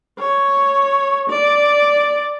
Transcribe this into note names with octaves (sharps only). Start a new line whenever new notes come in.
C#5
D5